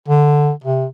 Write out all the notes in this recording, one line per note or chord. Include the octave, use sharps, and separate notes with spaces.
D3
C3